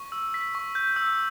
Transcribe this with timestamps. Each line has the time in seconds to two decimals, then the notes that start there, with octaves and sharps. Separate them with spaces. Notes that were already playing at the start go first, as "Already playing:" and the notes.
Already playing: C#6
0.12 E6
0.34 B6
0.55 C#6
0.75 G6
0.96 E6